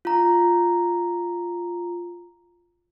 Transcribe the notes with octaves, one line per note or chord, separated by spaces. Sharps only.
F4 A#5